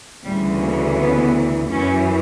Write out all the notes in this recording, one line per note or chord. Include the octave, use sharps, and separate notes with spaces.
D2 C#3 E3 G3
A#3
B3
F#2 E3 C#4